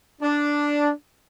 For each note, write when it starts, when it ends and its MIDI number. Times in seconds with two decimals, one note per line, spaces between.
0.22 0.91 62